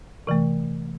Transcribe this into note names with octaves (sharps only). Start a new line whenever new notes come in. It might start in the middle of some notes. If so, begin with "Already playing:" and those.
C3 E3 A3